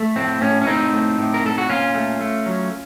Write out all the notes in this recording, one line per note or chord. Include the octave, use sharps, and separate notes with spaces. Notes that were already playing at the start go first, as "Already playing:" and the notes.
Already playing: A3
A2 C4
A2 C#4
C#4
A2 C4 D#4
A3
A2
A#4
A2 A4
F#4
A#2 C#4 F4
A3
A3
F#3